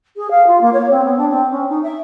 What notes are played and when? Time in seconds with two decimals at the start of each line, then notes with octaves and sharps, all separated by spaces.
0.16 G#4
0.30 F5
0.47 F4
0.60 A#3
0.73 C#5
0.90 C4
1.04 B3
1.17 D4
1.29 C4
1.50 C#4
1.69 D#4
1.82 E5